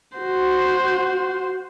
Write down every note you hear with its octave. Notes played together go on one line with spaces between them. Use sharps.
F#4 C5